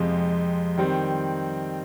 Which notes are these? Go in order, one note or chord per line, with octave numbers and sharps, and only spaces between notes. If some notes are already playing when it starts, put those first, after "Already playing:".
Already playing: F2 C3 F3 G#3
D#3 G3 C4